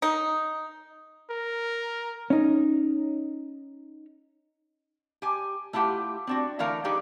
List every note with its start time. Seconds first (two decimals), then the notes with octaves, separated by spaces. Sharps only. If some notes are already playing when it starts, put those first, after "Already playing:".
0.02 D#4
1.30 A#4
2.30 C#4 D#4
5.22 G4 G#5
5.73 A3 E4 F4 G4 F#5
6.27 C4 D4 F#4
6.59 D3 E3 A3 A#4 F5 A#5
6.84 G3 D4 D#4 G4 G#4 B4